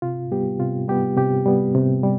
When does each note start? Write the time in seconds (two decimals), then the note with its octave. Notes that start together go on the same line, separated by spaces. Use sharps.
0.02 C3 F4
0.32 G3 B3 G4
0.60 C3 F4
0.88 G3 B3 G4
1.17 C3 G4
1.46 G3 B3
1.74 C3
2.03 G3